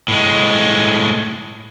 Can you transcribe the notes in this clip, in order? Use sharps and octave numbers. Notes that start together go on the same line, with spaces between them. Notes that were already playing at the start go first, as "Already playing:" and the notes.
A2 G#3